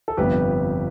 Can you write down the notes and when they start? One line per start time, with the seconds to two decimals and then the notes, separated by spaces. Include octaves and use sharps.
0.08 A4
0.17 G1 F2 C3 G3 B3 G4 B4